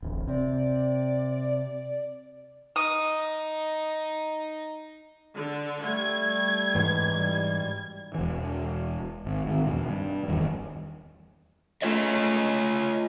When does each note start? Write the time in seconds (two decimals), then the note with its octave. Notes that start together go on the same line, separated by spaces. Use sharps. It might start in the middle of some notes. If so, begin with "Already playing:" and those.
0.03 D1 A1
0.28 C3 D5
2.76 D#4 D#6
5.35 D3
5.85 G3 A3 G#6
6.75 G#2 E3
7.16 G3
8.15 E1 E3
9.25 G#1
9.46 G#2 D#3
9.66 E2 B2
9.88 G2
10.28 D1 E2 D#3 G3
11.82 A3 F4 C#5 D#5